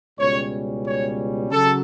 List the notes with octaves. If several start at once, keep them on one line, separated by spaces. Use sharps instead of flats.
C#2 B2 G3 C#4 C#5
C#5
C#3 F#3 A4